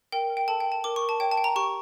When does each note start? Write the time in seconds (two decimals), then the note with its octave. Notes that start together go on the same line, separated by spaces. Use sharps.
0.12 A#4 G5
0.30 A#4
0.37 G5
0.48 A4 A5
0.60 G5
0.66 A4
0.72 A5
0.84 A#4 D6
0.96 C#6
1.02 A#4
1.09 A5
1.20 C#5 G5
1.32 A5
1.37 G5
1.44 A#5
1.56 G4 C#6